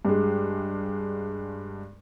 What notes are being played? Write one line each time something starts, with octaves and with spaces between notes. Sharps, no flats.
G2 G#3